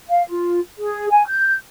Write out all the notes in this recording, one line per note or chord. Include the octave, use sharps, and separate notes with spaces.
F5
F4
G#4
G#5
G6